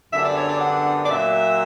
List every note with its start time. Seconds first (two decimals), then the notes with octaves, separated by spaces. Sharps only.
0.12 F#2 D3 G3 B3 D4 E5
0.25 D5
0.36 C#5
0.48 D5
0.61 F#5
1.04 D5
1.10 A#2 F#3 C#4 E5